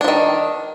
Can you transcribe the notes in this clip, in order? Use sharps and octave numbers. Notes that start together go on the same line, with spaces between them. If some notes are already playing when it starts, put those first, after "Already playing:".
D#3 F3 D4